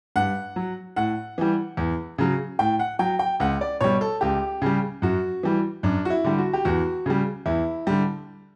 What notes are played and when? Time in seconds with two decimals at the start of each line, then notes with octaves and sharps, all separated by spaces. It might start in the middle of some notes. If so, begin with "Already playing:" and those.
0.16 G2 F#5
0.56 F#3
0.96 A2 F#5
1.38 E3 G3
1.77 E2
2.18 C#3 F#3
2.59 A2 G5
2.79 F#5
2.99 F#3 G5
3.19 G5
3.40 C#2 F#5
3.61 D5
3.81 B2 G3 C#5
4.01 A4
4.21 C#2 G4
4.62 C#3 G3
5.02 F#2 F#4
5.43 E3 G3
5.83 F#2 D4
6.05 F#4
6.10 E4
6.24 D3 G3
6.38 F#4
6.53 G4
6.65 E2 F#4
7.06 C#3 G3
7.46 E2 E4
7.87 D3 G3